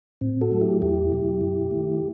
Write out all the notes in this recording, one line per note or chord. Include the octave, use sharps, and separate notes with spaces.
A2 C4
F#4 A4
F#3 A3
E4 G4
E2 E4 G4
B2 F#3
F#2
D#3 A3